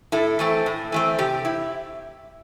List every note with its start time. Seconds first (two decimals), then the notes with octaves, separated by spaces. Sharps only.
0.12 A2 E4 A4
0.39 E3 A3 C4
0.66 A2
0.92 E3 A3 C4
1.19 C3 G4
1.45 E4